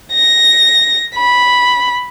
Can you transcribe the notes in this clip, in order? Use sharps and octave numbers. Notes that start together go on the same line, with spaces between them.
A#6
B5